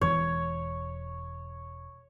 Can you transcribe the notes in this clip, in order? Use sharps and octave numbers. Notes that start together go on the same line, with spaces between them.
E1 E2 E3 C#5